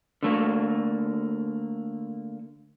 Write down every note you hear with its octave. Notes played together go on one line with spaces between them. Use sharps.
D3 A3 A#3